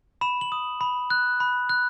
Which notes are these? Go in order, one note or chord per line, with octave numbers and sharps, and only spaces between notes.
B5 E7
F#7
D#6
B5
F#6
B5
F#6